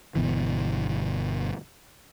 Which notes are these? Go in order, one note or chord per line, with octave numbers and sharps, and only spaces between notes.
G1 B2 E3